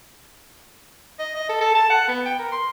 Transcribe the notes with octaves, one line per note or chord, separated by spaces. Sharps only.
D#5
D#5
A4
A4
A5
F#5
B3
G5
A#4
C6